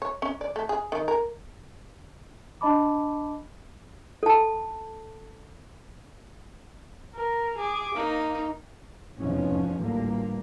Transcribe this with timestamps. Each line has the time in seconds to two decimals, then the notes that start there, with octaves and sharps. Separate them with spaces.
0.02 C#5
0.22 C#4
0.41 D5
0.56 A3
0.69 G#4
0.92 D#3
1.08 A#4
2.61 D4 D#5 A5 B5 D6
4.23 A4 A5
7.15 A#4
7.58 G#4 D6
7.95 A#3 D#4
9.19 F1 E2 G#2 B2 F3 C#4
9.79 A1 D2 A#2 G3 A#3